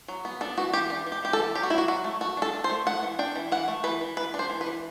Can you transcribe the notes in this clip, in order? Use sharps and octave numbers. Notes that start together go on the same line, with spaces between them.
F#3
B3
D4 A4
E3 F#4
E3 G4
D4 G4
E3
G4
E3 G4
A4
E3
F#3 G4
F#4
F#3 E4
F#4
F#3 F#4
A3
A3 F#4
D4 A4
D4
C5
A3
A3 F#5
E3
D4 G5
E3
E3 F#5
A3
E3 B4
E3
E3 B4
D4
C5
E3
B4
E3